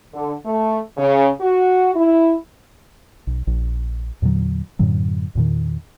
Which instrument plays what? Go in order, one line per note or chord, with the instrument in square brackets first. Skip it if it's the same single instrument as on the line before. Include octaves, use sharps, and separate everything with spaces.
[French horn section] D3
A3
C#3
F#4
E4
[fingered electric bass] B1
A#1
E2 A#2 D3 F#3
F#2 A2 D3 F#3
E2 A#2 D#3